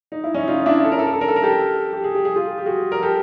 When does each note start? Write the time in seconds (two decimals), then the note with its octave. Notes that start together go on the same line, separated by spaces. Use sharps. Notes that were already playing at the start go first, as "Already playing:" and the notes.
0.12 D#4
0.24 E4
0.34 C#4 D#4
0.48 D#4 F4
0.66 D4 E4
0.84 A4
0.92 A#4
0.99 A4
1.06 A#4
1.14 A4
1.21 A#4
1.28 A4
1.36 A#4
1.43 G4 A4
1.93 G4
2.04 G#4
2.15 G4
2.25 G#4
2.36 F4 G4
2.58 G4
2.66 F#4 G#4
2.92 A#4
3.02 G4 A4